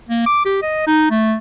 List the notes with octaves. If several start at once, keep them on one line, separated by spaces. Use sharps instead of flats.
A#3
D6
G4
D#5
D#4
A3